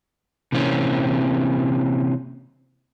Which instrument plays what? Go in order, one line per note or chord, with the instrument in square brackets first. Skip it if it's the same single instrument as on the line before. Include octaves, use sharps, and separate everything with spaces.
[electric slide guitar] C3 E3 A#3 C4 C#4